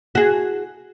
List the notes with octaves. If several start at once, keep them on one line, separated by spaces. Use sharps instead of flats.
F#4 G#4